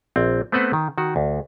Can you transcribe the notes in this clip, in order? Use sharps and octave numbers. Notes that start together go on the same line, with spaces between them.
A#1 C4
A3 B3 C4 B4 C5 F#5
D#3
D#3 F#4
D2